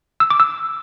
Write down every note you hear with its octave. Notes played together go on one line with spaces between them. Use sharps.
E6
D6
E6